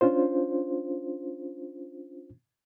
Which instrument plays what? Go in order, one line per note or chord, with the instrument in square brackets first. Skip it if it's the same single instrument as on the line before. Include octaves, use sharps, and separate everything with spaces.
[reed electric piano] C#4 D4 F4 C5